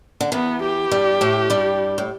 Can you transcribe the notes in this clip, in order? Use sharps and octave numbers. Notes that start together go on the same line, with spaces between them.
D3
E2 E3 B3
G4
G2 G3
A2 A3
G2 G3
A2